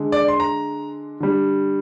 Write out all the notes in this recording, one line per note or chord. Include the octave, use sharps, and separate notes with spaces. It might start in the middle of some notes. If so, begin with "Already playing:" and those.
Already playing: D3 G#3
D5
C6
A#5
D3 G3